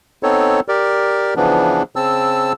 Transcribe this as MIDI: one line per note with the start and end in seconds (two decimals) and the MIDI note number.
0.23 0.60 59
0.23 0.60 60
0.23 0.60 63
0.23 0.60 69
0.23 0.60 73
0.68 1.34 67
0.68 1.34 70
0.68 1.34 74
1.36 1.83 49
1.36 1.83 52
1.36 1.83 53
1.36 1.83 59
1.36 1.83 62
1.96 2.53 49
1.96 2.53 60
1.96 2.53 81
1.96 2.53 88